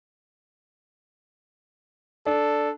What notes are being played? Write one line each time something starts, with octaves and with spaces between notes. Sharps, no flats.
D4 A4